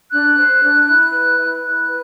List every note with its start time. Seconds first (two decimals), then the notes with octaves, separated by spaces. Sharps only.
0.11 D4 F#6
0.36 C5
0.61 D4
0.87 E4
1.12 B4
1.37 E4
1.62 E4 F#6
1.88 B4